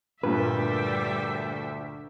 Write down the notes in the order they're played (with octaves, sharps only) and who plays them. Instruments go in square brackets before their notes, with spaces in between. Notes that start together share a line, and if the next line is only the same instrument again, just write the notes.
[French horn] D2 [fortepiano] G2 A#2 [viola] G3 E5 [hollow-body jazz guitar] A#3 B4